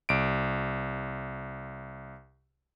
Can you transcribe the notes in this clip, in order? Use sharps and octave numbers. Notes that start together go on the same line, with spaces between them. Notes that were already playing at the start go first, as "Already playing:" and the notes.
C2 D7